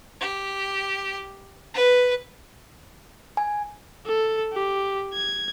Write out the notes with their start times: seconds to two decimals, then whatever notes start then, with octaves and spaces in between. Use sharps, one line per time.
0.21 G4
1.74 B4
3.37 G#5
4.06 A4
4.53 G4
5.14 G#6